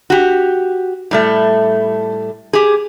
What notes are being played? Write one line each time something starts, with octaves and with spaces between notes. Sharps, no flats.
F#4 G4
A2 G3 A3
G4 G#4